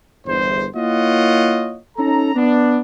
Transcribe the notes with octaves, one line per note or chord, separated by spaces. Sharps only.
G1 E2 C5
A#3 E4 F4 C#5 D#5 F#5
C#4 D#4 A4 A#5
B3 D4